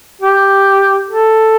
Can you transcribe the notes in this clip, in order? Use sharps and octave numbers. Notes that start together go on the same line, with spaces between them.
G4
A4